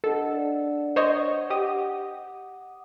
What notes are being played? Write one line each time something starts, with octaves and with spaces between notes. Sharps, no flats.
D4 A4 D#5 F#5
D4 D5 F#5
C5 C#5 D#5
G4 D#5 F#5 D6 D#6